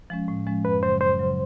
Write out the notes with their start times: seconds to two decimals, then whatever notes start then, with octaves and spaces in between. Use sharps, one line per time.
0.10 F3 G#3 C#4
0.28 A2
0.47 F3 G#3 C#4
0.64 F#2 B4
0.83 C#3 F#3 C5
1.01 F#2 C5
1.19 C#3 F#3